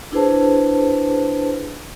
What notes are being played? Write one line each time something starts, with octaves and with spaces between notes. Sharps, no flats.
D4 E4 G#4 B4 C5 A5